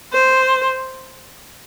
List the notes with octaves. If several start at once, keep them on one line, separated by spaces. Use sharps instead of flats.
C5